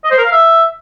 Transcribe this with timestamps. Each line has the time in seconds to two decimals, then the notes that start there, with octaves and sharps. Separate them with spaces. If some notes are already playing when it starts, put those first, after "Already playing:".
0.04 D#5
0.11 C5
0.18 A#4
0.25 F5
0.31 E5